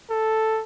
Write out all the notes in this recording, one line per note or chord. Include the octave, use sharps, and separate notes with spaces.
A4